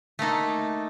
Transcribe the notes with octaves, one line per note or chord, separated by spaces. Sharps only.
A3 A#3 D#4 A4